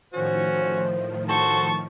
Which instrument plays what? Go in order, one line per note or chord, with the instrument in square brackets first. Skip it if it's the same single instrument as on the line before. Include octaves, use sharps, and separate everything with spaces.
[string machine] A2 D#3 F3 [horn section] C#4 F#4 [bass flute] C5
[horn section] F#4 A4 C5 [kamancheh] A5 C#6